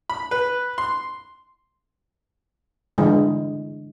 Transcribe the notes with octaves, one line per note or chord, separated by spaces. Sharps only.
B5
B4
C6
D3 E3 G#3